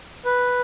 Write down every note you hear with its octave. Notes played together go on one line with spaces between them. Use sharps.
B4